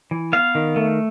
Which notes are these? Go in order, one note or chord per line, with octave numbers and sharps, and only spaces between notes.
E3
B3 F5
D#3
A3